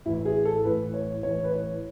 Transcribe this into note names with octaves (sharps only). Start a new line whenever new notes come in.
A1 A2 E3 E4
G#4
A4
A1 A2 E3 B4
C#5
A1 A2 E3 C#5
B4
C#5